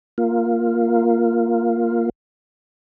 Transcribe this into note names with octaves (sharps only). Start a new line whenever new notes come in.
A#3 F4